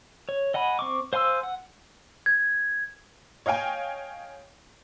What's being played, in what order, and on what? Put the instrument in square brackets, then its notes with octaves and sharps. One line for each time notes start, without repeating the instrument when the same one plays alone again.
[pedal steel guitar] C#5
D#5 F#5 G#5 B5
C4 C#6 D6
C5 F5 G#5 C6 E6
F#5
[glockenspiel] G#6
[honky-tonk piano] C#5 D#5 F5 G5 G#5